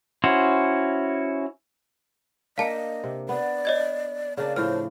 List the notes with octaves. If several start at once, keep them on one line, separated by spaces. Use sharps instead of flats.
C#4 E4 F#4 C5
A#3 D4 D#5 F5 A5 C#7
C3
B3 D5
C#5 D#5 G#6
C#3 A#3 D4 D5
A2 F3 C5 F6